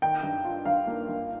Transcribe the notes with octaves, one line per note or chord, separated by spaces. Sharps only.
D#3 G5
G2
F4
G2 F5
A#3
G2